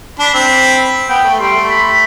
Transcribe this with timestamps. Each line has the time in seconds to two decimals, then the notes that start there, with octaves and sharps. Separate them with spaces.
0.19 D4 B5
0.34 C4
1.09 B3 G5
1.24 A3
1.39 G3 C6
1.55 A3
1.70 B5